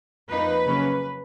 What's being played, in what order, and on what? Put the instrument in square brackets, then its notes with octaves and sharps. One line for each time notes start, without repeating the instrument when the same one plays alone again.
[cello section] F2 F3 A#3 D#4 B4
C#3 F#3 A#3 C#4